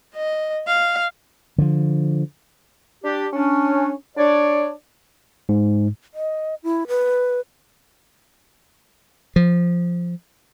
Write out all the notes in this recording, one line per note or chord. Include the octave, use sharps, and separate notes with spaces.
D#5
F5
D3 F3
D4 G4
C#4 D4
D4 C#5 D5
G#2
D#5
E4
B4
F3